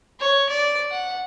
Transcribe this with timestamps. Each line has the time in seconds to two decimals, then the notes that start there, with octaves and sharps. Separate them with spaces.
0.20 C#5
0.49 D5
0.91 F#5